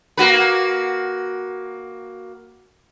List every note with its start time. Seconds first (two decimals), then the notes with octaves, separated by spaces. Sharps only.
0.17 A#3 F#4 B4